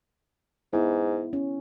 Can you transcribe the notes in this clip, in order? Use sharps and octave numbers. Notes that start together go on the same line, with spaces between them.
G#2 B3 E4
C#4